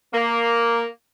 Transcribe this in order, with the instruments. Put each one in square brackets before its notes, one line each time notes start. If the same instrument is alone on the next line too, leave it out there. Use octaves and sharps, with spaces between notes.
[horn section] A#3